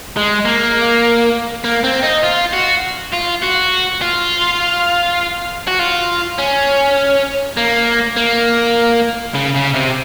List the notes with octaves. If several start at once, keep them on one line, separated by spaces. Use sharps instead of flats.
G#3
A#3
A#3
C4
D#4
F4
F#4
F4
F#4
F4
F#4
F4
C#4
A#3
A#3
C#3
C#3
C3